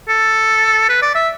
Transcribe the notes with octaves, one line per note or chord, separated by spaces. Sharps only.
A4
B4
D5
E5